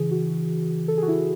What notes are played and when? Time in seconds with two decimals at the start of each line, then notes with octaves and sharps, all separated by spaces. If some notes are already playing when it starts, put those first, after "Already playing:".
Already playing: C#3 E3 G#4
0.11 F#4
0.88 A4
0.97 G#4
1.02 F#4
1.08 E4